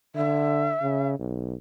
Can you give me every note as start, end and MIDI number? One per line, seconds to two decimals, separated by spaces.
0.15 0.74 50
0.15 1.09 76
0.82 1.14 49
1.19 1.55 35